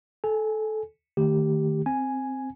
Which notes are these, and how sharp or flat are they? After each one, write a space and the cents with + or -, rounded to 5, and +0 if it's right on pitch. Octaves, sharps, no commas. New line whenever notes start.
A4 -20 G#5 +0
D#3 -15 A3 +30 G4 -5
C4 +0 G#5 +0